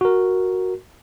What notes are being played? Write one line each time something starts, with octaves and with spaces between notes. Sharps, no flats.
F#4 A#4